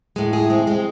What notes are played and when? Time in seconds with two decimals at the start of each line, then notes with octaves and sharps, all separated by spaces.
0.16 A2 G#3
0.33 E4 G#4
0.50 G#3 C4
0.67 G#3 C4